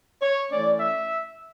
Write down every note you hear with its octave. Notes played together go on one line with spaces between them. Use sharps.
C#5
E3 A3 C#4 D5
E5